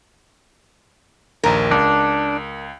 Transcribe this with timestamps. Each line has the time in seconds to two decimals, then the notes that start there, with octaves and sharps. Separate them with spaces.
1.43 A#1 D#2 A#4
1.71 C#2 D4